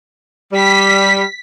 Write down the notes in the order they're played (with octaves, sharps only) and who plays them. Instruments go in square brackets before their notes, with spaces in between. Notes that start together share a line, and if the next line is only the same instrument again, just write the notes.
[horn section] G3 [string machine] B6